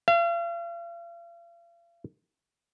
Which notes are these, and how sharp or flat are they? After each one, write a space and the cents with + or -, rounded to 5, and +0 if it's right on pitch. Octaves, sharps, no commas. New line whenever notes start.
F5 -40